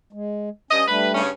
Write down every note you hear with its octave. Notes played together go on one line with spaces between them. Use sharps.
G#3
G2 C#4 D#5
G3 A3 D4 B4
G2 C#3 C#4